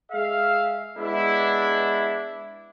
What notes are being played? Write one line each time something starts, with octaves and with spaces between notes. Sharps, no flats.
G#3 G#4 E5 F5
G#3 B3 D4 E4